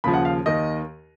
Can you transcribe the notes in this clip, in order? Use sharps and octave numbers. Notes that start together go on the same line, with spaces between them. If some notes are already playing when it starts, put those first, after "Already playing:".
D#2 C#3 F3 B5
F#5
F5
D#2 D#3 D#5